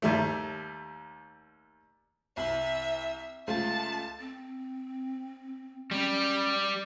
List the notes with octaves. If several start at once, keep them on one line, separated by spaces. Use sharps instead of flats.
D#2 G3 A3
C2 E5 F#7
C#2 A3 F4 A5
C4
G3 C#4